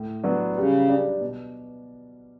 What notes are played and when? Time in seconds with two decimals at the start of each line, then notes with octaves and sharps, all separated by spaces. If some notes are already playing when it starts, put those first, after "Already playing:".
Already playing: A2
0.24 F#3 B3 D4 F#4
0.56 C#3 G3
0.89 D4 G4 D5
1.21 B2